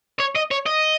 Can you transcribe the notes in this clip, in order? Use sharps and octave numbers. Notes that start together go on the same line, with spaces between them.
C#5
D#5
C#5
D#5